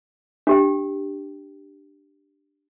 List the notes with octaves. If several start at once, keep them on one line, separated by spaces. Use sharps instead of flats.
D4 G4 G5